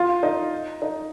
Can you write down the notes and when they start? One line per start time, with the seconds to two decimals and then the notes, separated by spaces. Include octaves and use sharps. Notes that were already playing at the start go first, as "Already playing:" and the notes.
Already playing: F4
0.23 D#4
0.82 D#4